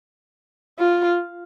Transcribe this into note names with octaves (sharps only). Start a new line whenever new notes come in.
F4